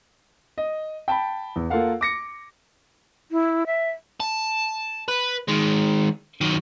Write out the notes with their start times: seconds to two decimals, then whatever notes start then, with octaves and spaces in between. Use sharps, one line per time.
0.58 D#5
1.08 G5 A5 B5
1.56 E2
1.70 A#3 F4 A4 A#4 F5 F#5
2.01 D6 A#6 C#7
3.32 E4
3.67 E5
4.20 A5
5.08 B4
5.48 D#3 G#3
6.41 D#3 F#3